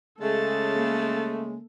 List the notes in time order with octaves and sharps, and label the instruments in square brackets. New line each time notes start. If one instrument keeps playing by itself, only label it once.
[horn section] C#3 G#3 [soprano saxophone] A3 [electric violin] A4 A6
[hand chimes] A#3